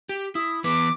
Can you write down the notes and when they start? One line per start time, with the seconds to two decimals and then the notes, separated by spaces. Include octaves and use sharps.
0.09 G4
0.35 E4 D#6
0.64 E3 B3 B4 D6